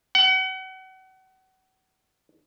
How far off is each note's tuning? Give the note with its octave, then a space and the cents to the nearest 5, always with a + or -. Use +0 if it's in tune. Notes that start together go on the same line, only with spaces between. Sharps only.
F#5 +35